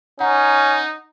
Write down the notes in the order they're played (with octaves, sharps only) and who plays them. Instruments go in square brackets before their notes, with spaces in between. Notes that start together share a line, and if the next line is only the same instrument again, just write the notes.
[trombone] C#4 [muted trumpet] D#4 [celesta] F#5 A#5